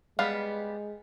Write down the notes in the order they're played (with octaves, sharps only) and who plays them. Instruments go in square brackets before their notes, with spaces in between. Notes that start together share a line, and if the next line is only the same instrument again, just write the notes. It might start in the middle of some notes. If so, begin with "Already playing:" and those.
[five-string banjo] G3 B3 F5 [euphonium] G#3